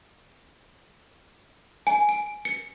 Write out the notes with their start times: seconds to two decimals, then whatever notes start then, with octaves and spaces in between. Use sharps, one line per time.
1.87 G#5
2.09 D7
2.45 C#7